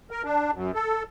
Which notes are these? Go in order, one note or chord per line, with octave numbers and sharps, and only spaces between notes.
A#4
D4
F#2
A4